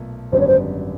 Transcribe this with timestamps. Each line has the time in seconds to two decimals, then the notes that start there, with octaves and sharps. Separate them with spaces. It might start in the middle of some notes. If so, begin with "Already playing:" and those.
Already playing: B1 A#2 A3
0.32 G#1 F#2 D3 G3 B3 C5
0.40 C#5
0.47 C5